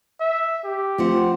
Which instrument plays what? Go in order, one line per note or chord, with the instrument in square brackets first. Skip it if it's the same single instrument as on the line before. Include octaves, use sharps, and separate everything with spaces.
[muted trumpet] E5
G4
[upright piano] F3 [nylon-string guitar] A3 C4 F#5